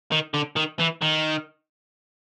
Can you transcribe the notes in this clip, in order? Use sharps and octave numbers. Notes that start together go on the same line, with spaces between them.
D#3
D3
D#3
E3
D#3